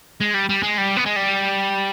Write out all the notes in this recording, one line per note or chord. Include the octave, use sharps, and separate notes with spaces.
G#3
G3
G3
G#3
G3
B3
G#3
G3